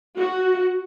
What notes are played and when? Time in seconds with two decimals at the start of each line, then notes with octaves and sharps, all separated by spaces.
0.17 F#4